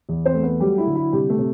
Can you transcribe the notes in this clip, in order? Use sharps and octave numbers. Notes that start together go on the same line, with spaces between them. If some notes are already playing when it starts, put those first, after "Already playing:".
E2
C4 C5
A3
B3 B4
F#3 G3 G4
E4
D3
E4
C3 G3 G4
A3 A4
C3